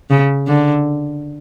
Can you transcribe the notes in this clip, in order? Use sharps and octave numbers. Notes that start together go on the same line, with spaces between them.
C#3
D3